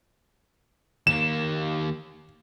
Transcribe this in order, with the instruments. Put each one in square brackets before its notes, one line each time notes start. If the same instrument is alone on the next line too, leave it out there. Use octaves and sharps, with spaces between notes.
[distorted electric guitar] D#2 A#3 [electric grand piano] E7